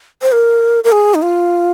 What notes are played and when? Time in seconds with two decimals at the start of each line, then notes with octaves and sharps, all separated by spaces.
0.22 C5
0.32 A#4
0.84 A#4
0.92 G#4
1.15 D#4
1.22 F4